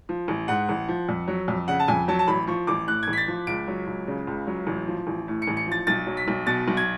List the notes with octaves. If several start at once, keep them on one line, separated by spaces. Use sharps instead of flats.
F3
A1
G#2 F#5
A1
F3
F2
F#3
F2
C#3 F#5
A5
F2 G#5
F#3 A5
A5
A1 B5
F3 C#6
A1 D6
A2 F#6
A1 G#6
B6
A6
F3
C#2 D7
F#3
C#2
C#3
C#2
F#3
A1
F3
A1
A2
C#7
A1
C#7
F3 A6
B1 A6
F#3
B6
B1
B2 A6
B1
G#6